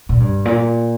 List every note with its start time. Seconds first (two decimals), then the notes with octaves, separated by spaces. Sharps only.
0.09 A#2
0.20 G2
0.45 A#2